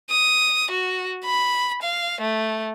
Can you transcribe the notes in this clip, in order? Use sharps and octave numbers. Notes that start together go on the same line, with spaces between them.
D#6
F#4
B5
F5
A3